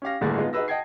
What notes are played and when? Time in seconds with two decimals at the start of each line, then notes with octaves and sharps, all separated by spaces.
0.02 C#4 G4 F5 A#6
0.21 G1 A2 D3 A#3 G#4 A6
0.38 G#3 B3 D#4 F4
0.53 D#4 F#4 G#4 B4 E6 A#6
0.68 D#5 F#5 G5 A5 G#6 C7